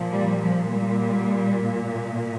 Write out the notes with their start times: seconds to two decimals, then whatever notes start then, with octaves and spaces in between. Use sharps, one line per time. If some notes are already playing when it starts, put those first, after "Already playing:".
Already playing: A#2 F3
0.12 G3
0.41 F3
0.69 G3